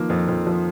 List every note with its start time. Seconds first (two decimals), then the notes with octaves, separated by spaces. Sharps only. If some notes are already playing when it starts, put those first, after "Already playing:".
Already playing: D#3 F3 A#3
0.10 F2
0.28 F2
0.47 F3